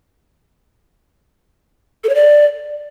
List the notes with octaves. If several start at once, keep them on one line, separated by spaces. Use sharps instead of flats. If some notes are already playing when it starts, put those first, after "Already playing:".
A4
C#5
D5